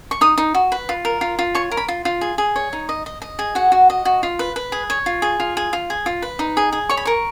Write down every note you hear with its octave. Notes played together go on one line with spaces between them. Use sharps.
C#6
D#4 D#6
D#4
F#4
B4
F4
A#4
F4
F4
C#5 C#6
A#4
B5
F4
F4
G#4
G#4
C#5
D#4
D#5
D#5
D#5
G#4
F#4 F#5
F#4
D#5
F#4
F4
B4
B4
G#4
C#5
F4
G#4
F4
G#4
F4
G#4
F4
B4
D#4
G#4
G#4
C#5 C#6
B5
A#4 C#6